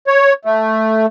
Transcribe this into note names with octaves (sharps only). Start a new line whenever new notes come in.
C#5
A3